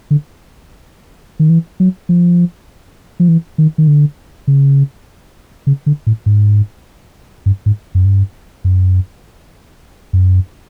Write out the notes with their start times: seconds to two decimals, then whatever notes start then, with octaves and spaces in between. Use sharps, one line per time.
0.11 D3
1.40 D#3
1.50 E3
1.80 F#3
2.09 F3
3.20 F3
3.28 E3
3.58 D#3
3.78 D#3
3.87 D3
4.47 C#3
5.67 C#3
5.86 D3
6.07 A2
6.26 G#2
7.46 G2
7.66 G#2
7.95 F#2
8.05 G2
8.64 F#2
10.13 F#2